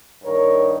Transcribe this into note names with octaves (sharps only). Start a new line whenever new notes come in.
G2 D#3 A#4 C#5